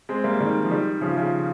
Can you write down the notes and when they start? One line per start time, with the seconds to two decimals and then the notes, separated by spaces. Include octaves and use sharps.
0.09 G#3 C4
0.24 G3 A#3
0.40 D#3 G3
0.64 F3
0.71 D#3 G3
1.01 C#3 F3
1.17 C#3 F3